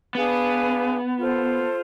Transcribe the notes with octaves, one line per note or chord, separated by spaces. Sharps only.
B3 D4 G#4 B4 F5
F4 A4 C5